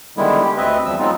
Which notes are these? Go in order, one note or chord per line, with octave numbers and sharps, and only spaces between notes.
D3 D#3 G3 G#3 B3 E4
G4
D2 C4 B4 D#5 E5
E2 F3 G3 E6
F#3 G#3 B3 C4 D#4 F4